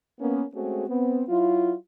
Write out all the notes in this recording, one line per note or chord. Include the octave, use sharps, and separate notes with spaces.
A#3 B3 C#4
G#3 A3 C4 C#4 F#4 G#4
B3 C4
F#3 E4 F4